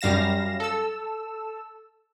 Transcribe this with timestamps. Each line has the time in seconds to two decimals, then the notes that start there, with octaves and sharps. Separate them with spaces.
0.01 F#2 G3 F5 A#6 E7
0.60 A4 E6